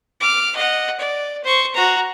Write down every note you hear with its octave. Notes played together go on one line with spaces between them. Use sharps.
D6 F6
D#5 F#5
D5
C5 C#6
F#4 A#5